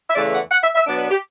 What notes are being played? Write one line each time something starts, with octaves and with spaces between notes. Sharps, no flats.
E5
E2 C#3 E3 A3 D5
F#5
F#5
E5
E5
B2 F#3 B3 D4 D5
B4
G4